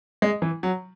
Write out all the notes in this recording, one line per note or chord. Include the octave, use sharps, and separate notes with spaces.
G#3
E3
F#3